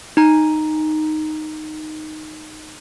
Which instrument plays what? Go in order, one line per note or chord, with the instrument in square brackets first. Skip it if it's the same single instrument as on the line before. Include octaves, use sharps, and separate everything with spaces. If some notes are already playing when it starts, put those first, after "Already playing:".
[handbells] D#4 A#5